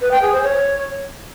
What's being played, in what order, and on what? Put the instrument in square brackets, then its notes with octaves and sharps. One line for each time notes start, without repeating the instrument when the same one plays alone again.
[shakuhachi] B4
G5
G#4
C5
C#5